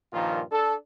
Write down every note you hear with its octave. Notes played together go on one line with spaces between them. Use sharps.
G2 A#2 D#3 F3 F4
D4 A4